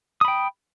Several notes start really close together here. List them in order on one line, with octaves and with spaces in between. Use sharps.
D#6 B5 G5